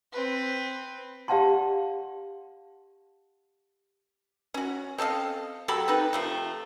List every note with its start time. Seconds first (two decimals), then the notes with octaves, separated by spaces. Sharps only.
0.13 C4 B4
1.28 G4 D5 F5 F#5 A5 C6
4.54 C#4 F#4
4.98 C4 A4 D#5 F5
5.68 F#3 G4 A4 B5
5.88 C4 D#4 B4
6.13 C3 F3 A3